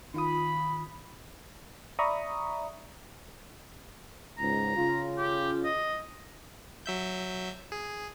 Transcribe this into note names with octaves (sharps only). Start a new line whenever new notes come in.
D#3 F4 B5 D#6
D5 E5 A#5 B5 C#6 D#6
C#2 G#2 A#5
C#3 F4
G4
D#5
F#3 E5 G6
G#4